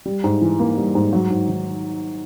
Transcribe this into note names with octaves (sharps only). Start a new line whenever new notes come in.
G3
G#2
E3
A#3
G3
G#2
F#3
G#2
D#3